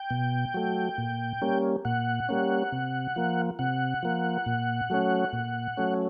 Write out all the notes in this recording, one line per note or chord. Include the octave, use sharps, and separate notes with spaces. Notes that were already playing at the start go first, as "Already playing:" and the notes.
Already playing: G5
B2
F#3 A3
A#2
G3 A#3 C#4
A#2 F#5
G3 A#3 C#4
C3
F3 A#3
C3 F#5
F3 A#3
A#2
F#3 A3 C#4
A#2
F#3 A3 C#4